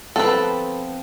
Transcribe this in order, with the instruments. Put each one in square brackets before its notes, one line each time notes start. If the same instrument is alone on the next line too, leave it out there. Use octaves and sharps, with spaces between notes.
[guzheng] F3 B3 C4 [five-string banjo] A4 B4